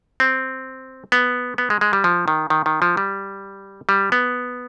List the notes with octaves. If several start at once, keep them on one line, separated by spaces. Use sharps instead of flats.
C4
B3
B3
G#3
G#3
G3
F3
D#3
D#3
D#3
F3
G3
G3
B3